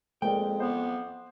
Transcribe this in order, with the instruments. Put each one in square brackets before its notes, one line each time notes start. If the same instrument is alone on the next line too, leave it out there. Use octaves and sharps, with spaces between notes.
[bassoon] F2 [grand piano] G#3 A#3 D5 [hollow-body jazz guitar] G5
[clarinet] B3 [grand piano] C5